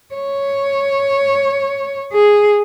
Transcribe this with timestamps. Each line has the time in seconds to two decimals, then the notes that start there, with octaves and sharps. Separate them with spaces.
0.15 C#5
2.13 G#4